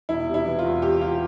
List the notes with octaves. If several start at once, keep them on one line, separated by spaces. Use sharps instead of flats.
E1 E4
C3
E4
E3
F4
E2
C3 G4
C3 F4